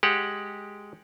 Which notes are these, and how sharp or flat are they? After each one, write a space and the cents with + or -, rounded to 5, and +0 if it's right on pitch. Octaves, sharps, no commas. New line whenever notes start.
G#3 +0 G4 +0 F#5 +0